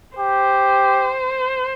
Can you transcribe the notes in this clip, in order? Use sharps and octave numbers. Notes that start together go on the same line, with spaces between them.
G4 C5